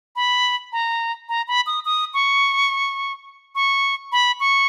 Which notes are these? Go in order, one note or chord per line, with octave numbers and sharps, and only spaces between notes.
B5
A#5
A#5
B5
D#6
D#6
C#6
C#6
B5
C#6